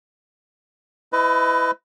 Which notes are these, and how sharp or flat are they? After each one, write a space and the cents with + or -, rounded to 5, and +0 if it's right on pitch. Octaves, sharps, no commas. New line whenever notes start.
E4 +0 B4 +30 D#5 +0